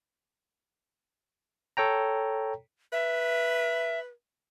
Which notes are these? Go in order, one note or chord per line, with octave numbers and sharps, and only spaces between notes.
A4 C#5 G5 A#5
B4 E5